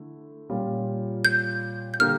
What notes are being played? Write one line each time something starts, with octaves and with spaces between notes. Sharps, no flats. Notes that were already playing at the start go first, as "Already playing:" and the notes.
Already playing: D3 A3 E4
A#2 G3 C#4 F4
G6
G6
D3 G3 A#3 D4 G4 F6